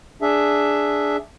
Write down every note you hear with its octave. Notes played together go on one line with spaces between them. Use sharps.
D4 G#4 E5